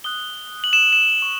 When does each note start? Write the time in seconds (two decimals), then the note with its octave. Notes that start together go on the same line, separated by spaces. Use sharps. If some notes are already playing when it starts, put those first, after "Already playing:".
0.04 D#6 F#6 G7
0.64 F#7
0.73 E7
0.93 E7
1.22 C#6